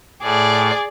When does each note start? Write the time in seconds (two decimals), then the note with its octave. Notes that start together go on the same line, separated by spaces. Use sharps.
0.23 A2 G#4 D5